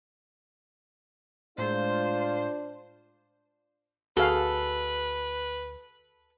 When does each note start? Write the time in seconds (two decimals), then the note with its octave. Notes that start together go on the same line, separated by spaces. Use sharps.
1.58 A2 G#3 D4 F4 C5
4.17 D2 F#4 G#4 A4 B4 F5